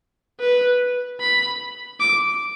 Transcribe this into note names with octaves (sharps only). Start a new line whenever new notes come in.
B4
B5
D6